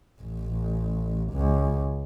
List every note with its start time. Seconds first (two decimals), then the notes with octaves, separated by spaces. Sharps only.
0.21 A1
1.33 C#2